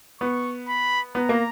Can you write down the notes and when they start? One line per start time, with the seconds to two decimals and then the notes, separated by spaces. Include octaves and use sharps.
0.21 B3 C#6
0.68 B5
1.15 B3 A#5
1.29 A#3